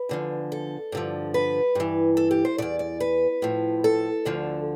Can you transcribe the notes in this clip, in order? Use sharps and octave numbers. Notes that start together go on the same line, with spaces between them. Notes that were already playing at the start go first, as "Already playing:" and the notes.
Already playing: B4
E2 D3 F3
A4
G2 D3 F3
B4
G2 E3
A4
G4
C5
E2 B2 D5
D5
B4
A2 F3
A4
D2 D3 F3